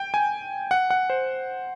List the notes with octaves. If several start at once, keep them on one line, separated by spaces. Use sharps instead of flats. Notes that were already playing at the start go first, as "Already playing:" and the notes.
Already playing: G5
G#5
F#5
F#5
C5